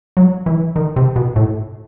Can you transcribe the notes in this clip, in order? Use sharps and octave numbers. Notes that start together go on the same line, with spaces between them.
F#3
E3
D#3
C3
B2
A2